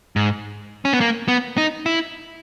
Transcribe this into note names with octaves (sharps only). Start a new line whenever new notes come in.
G#2
C#4
B3
A#3
B3
D#4
E4